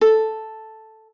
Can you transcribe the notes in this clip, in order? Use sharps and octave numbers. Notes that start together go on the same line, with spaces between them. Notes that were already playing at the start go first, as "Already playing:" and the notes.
A4